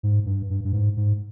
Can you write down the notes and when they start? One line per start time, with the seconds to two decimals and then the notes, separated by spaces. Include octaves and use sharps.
0.03 G#2
0.26 G2
0.50 G2
0.64 G2
0.73 G#2
0.97 G#2